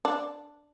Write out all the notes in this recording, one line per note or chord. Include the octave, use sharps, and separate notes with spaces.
D4